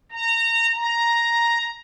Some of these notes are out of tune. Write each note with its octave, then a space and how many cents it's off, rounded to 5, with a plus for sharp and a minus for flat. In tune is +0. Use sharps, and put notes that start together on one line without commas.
A#5 -25
A#5 +5